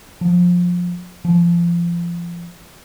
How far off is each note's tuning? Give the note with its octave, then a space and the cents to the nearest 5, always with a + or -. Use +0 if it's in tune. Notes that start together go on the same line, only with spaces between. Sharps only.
F3 +20
F3 -25